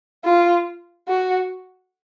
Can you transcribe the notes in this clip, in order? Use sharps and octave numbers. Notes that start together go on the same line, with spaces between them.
F4
F#4